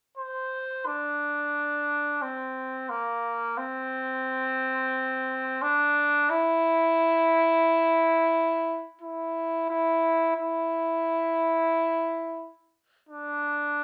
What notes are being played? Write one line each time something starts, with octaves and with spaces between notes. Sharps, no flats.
C5
D4
C4
A#3
C4
D4
E4
E4
E4
E4
D4